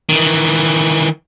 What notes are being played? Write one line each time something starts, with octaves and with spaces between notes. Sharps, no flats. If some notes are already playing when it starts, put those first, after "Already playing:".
D#3 E3